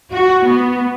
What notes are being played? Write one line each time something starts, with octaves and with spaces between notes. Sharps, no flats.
F#4
B3